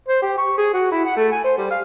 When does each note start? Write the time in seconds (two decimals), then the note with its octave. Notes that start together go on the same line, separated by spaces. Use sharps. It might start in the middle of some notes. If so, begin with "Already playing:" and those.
0.08 C5
0.22 G4
0.38 C#6
0.57 G#4
0.73 F#4
0.91 E4
1.05 F#5
1.16 A3
1.32 G#5
1.44 C5
1.57 G3
1.71 F5